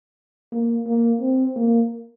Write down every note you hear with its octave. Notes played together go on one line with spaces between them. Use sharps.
A#3
A#3
C4
A#3